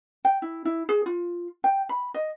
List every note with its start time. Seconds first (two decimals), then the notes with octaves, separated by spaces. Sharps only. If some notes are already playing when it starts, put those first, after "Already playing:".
0.25 G5
0.42 E4
0.65 E4
0.89 G#4
1.06 F4
1.64 G5
1.89 B5
2.14 D#5